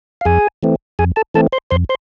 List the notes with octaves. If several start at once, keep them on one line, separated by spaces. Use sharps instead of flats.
F5
F2 G#4 G#5
E3 A3 C4
F2 G#4 G#5
A4 A5
E3 A3 C4 A4 A5
C5 C6
F2 C5 C6
C5 C6